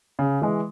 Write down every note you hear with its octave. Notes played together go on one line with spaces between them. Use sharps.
C#3
E3 G#3